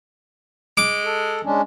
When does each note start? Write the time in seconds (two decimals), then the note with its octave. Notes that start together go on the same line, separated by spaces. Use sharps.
0.77 G#3 D6
1.05 A4
1.45 G#3 C#4 D4